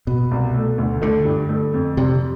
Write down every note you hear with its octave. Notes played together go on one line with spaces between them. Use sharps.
B2 B3
C2
A3
D2
D3 A3
G2
A3
F2
C3 G3